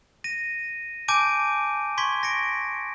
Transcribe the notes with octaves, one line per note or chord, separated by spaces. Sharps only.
A#6 D#7
G#5 A5 D6 G6 D7 D#7
C6 C#6 G#6 B6
A#6 B6 C#7 D7